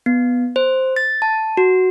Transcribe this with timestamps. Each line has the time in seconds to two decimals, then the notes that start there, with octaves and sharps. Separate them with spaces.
0.06 B3
0.56 C5
0.96 A6
1.22 A5
1.57 F#4